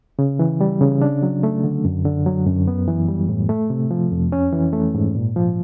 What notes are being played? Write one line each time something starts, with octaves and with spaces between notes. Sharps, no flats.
C#3
E3
G3
C#3
D4
F#3
A3
D3
F#2
D3
F#3
F#2
B3
E3
G3
A2
A3
C3
F3
F2
C#4
E3
A3
G#2
A#2
F3